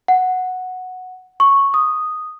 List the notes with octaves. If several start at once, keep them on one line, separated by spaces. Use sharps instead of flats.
F#5
C#6
D#6